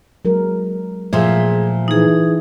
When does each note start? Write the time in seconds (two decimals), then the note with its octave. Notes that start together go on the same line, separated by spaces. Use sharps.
0.25 F#3 G#3 A#4
1.13 A#2 F3 A3 G#4 E5 F5
1.88 E3 D#4 G#4